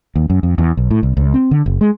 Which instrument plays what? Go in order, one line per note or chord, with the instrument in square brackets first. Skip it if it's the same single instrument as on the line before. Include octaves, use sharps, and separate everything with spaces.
[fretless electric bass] D#2
F#2
F2
E2
B1
A2
C2
C#2
C4
D3
F#1
G#3